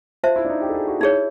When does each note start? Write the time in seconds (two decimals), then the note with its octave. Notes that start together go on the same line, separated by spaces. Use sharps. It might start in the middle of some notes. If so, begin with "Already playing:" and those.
0.23 F4 C5 E5 A5
0.36 E4
0.45 D4
0.49 D#4
0.62 G4
0.69 A4
0.75 G#4
0.87 F#4
1.00 D#4 E4 G#4 C#5